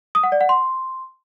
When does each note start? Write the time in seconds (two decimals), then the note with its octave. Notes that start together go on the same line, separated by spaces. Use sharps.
0.15 D#6
0.23 F#5
0.32 D5
0.41 F#5
0.49 C6